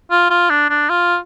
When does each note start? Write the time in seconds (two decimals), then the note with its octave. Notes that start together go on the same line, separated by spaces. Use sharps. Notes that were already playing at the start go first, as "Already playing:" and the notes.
0.11 F4
0.30 F4
0.50 D4
0.70 D4
0.90 F4